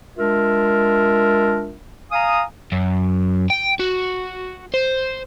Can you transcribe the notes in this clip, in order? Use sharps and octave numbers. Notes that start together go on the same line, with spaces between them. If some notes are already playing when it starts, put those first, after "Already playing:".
G#3 D4 F4 A#4 E5
F5 G#5 A#5 D#6
F#2
G5
F#4
C5